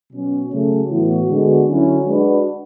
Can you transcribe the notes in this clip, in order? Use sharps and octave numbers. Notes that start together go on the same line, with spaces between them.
B2 F#3 C#4
C#3 F#3 A3 C#4
A2 E3 B3 F#4
D3 G#3 B3 F#4
D3 F#3 C#4 E4
G#3 D4 F#4 B4